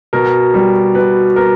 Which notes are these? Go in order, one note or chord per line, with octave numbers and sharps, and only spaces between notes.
B2 A#4
G3
B2 B4
B3 A#4